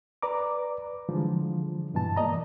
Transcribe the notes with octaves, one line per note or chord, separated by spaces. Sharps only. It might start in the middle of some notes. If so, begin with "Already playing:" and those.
B4 D5 A#5 D6
D3 E3 F3 G3 G#3
G2 B2 E3 A5
A#3 D5 D#5 A#5